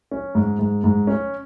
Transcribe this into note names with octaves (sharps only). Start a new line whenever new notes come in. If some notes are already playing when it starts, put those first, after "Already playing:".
C#4
G#2
G#2
G#2
C#4